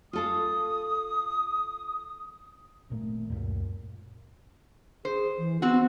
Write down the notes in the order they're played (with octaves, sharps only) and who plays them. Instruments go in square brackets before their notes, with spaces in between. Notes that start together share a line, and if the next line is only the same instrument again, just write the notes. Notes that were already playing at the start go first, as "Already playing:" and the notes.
[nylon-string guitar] F4 A4 F5 [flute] D#6
[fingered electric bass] G#1 A#2 A3
C#2 F#2 A#2
[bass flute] G#4 [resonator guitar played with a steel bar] C5
[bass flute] E3
[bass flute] B3 [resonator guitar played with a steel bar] C4 F#4